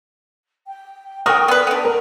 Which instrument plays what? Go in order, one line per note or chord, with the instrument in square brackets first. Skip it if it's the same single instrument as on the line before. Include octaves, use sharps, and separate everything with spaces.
[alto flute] G5
[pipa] A3 F#4 A#4 [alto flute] A4 [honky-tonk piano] G5 D#6
[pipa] B3 B4 [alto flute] D5
[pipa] B3 D4 [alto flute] A4
[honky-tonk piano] A#4